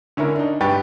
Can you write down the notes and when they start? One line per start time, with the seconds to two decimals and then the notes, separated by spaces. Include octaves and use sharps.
0.17 D3 C#4 E4 A#4
0.36 D4 D#4
0.61 G2 G4 B4 C#6 A6